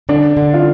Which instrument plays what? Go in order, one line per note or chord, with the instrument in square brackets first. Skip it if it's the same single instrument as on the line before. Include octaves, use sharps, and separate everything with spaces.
[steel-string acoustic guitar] D3 [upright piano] D4
[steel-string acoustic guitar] D3
[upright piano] F4